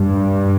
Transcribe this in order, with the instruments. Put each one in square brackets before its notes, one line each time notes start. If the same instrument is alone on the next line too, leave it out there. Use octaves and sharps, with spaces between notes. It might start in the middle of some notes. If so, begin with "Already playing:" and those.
Already playing: [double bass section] G2